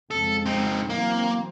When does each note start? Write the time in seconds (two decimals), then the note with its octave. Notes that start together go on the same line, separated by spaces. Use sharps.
0.11 F2 C#3 G#3 A4
0.46 C4 D#4
0.89 E3 F#3 A#3 C4